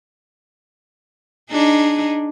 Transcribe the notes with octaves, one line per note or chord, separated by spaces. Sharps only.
D4 D#4 G#4